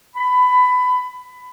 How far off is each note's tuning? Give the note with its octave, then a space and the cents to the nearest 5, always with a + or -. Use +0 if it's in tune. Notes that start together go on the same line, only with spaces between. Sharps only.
B5 +20